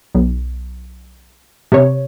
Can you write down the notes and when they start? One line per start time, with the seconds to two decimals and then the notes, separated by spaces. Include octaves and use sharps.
0.15 B1
1.72 C3 C#5